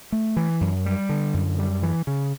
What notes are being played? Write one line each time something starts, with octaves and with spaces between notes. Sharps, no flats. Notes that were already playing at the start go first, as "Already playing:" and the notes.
A3
E3
F#2
G3
D3
F#2
G3
E3
C#3